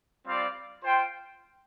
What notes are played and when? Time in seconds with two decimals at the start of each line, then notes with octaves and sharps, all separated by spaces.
0.27 G3 C4 F4 D5 F5
0.83 F4 C5 G5